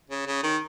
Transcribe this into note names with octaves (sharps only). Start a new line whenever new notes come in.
C#3
C#3
D#3